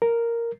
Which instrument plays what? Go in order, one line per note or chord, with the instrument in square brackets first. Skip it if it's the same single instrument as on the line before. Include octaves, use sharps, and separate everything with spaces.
[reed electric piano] A#4